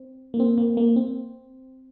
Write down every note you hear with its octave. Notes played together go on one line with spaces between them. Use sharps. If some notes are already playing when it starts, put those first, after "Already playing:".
Already playing: C4
A#3
C4
A#3
A#3
C4